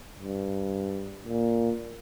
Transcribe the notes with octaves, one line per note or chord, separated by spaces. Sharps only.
G2
A#2